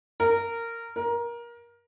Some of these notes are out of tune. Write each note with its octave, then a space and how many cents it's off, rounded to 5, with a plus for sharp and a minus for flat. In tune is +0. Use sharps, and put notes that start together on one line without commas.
A#4 -15
A#4 +20